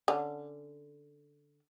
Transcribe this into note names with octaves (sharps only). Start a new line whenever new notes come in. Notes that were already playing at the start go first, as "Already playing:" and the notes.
D3 C#4